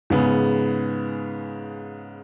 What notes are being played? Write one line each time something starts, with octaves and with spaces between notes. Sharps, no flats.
G#2 C#3 B3